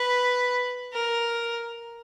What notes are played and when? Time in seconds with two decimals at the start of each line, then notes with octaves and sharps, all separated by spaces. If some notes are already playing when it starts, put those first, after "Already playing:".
Already playing: B4
0.93 A#4